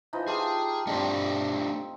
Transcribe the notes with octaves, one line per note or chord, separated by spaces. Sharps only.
E3 F3 D#4
F4 G4 G#4 A5
A3 C4 D4 G4 D#5